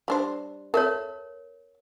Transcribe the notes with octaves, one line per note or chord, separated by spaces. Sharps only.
G3 D4 C5
A4 A#4 C#5 E5